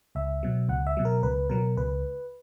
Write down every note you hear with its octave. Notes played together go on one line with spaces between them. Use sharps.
C#2 E5
B2 F#3
C#2 F#5
E5
B2 F#3
A#4
C#2 B4
B2 F#3 A#4
C#2 B4